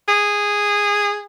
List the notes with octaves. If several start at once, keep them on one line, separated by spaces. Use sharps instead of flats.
G#4